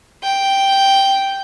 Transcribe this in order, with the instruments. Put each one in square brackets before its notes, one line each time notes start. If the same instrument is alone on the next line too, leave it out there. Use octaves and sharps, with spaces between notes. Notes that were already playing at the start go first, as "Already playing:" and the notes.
[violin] G5